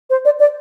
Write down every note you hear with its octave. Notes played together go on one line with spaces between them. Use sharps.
C5
D5
D5